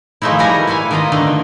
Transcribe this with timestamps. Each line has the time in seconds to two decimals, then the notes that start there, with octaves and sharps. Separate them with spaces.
0.22 D#3 F3 G#3 A3 D#4 E4
0.39 E3 G3 A#4 F#5 G#5 A#5
0.67 E4 A4 F5 G#5
0.91 D#3 B3 E4 F4 D#5
1.12 D3 D#3 A3